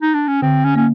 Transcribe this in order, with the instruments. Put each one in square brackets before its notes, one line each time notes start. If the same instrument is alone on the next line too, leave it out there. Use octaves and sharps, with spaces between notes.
[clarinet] D#4
D4
C#4
[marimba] D3 [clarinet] C4
[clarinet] C#4
[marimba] A#3 [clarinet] C#4